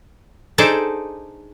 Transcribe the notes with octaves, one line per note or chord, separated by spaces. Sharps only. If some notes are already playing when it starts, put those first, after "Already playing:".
D4 D#4 G#4 A4 C5 D5